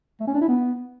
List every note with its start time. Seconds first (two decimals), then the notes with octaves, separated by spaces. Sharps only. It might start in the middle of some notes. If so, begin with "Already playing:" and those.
0.20 A3
0.27 C#4
0.34 D4
0.41 E4
0.49 B3